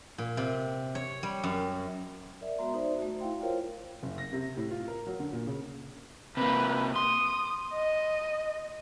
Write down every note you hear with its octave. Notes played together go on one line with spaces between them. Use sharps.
A#2
C3
C#5
G3
F#2
A#4 D5 E5
G#3 B3 F#4 E5 A#5 C6
D#4 C5 D5 E5
A3 F#4
E4 F5 G5 C6
F4 A#4 C5 C#5 F5
F#1
A#6
C3
A2
F4
A#4
F#3
D3
A#2
C#3
C3 A#3 B4
C6 D#6
D#5